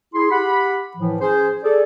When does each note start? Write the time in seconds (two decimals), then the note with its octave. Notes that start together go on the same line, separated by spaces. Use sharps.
0.14 E4 G#4 C6
0.30 G4 F#5 B5
0.97 A2 E3 F3
1.20 C#4 G#4 C5
1.63 G#4 A4 D5